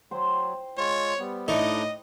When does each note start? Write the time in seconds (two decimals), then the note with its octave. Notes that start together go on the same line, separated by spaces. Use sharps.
0.11 F#3 C5 G5
0.78 G#3 F4 C#5
1.19 G3 B3
1.48 A2 D4 D#4 D#5 D6